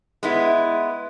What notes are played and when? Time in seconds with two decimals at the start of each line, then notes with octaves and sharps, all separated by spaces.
0.23 G#3 B3 E4